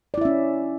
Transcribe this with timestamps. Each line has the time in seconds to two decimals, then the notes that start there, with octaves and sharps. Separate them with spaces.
0.14 D5
0.18 E4
0.21 E5
0.25 C#4